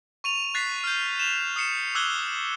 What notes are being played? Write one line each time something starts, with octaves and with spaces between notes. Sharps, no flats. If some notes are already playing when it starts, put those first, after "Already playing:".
C#6 D#7 F7
F#6 A6 B6 C7
F6 G6
E7 F7
D#6 C7 C#7 E7
D6 E6 F#6 G#6 G7